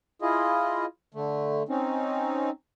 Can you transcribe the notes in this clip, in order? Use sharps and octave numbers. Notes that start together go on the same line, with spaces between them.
E4 F4 G#4 D#5
D3 A3
C4 C#4 D#4